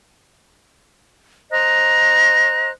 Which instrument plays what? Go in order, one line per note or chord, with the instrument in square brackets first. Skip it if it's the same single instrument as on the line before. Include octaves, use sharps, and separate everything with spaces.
[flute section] C5 D#5 A#5 F#6